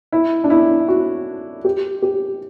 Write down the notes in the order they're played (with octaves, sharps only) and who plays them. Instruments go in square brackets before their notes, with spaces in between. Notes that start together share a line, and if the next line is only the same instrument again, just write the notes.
[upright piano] E4
D4
E4
F#4
G4
G4